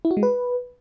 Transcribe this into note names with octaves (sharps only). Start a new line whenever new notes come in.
E4
F#4
G#3
B4